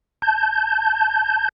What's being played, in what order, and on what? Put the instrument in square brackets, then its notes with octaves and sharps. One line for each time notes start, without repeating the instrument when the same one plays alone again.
[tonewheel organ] A5 G6